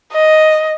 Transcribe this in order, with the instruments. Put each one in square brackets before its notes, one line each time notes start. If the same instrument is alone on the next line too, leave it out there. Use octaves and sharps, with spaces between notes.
[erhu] D#5